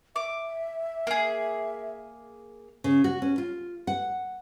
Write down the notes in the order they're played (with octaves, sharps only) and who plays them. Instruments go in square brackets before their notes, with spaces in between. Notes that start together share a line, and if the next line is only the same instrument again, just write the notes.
[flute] E5 [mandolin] D6
[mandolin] A#3 G#4
[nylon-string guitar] C#3
F#4
C#4
F4
F#5